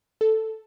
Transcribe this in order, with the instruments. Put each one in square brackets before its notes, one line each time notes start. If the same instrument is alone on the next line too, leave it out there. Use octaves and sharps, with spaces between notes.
[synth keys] A4